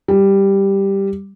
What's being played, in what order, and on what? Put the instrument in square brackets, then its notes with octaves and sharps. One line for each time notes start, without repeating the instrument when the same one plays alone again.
[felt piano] G3